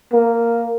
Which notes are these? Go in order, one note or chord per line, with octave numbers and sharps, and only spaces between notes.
A#3